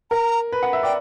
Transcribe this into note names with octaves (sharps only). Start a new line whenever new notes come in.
A#4 A#5
B4
F#5
E5
D5 G5